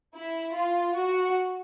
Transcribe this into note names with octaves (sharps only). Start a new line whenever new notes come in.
E4
F4
F#4